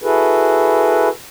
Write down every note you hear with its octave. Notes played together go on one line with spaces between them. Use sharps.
E4 F#4 G#4 A4 B4